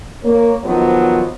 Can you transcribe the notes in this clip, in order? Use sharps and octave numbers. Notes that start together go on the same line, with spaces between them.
A#3 C#5
D#3 F3 F#3 B3